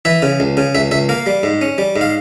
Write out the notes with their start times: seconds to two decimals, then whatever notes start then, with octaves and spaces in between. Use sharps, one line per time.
0.05 E3 E5
0.22 C#3
0.40 C#2
0.57 C#3
0.75 C#2 E5
0.91 C#2 E5
1.09 A#3 F5
1.26 G3
1.43 G#2
1.61 C#4
1.78 G3
1.96 G#2
2.01 F5